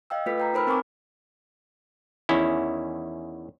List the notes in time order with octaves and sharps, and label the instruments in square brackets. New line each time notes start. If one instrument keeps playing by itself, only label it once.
[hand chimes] D#5 F5 G5 E6
A3 F4 A4 B4 B6
B4 G5 A#5
D#4 A#4 C5 B5 E6 F6
C4 A#4 G#5 C#6 D6
[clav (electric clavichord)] E2 D#3 C#4 E4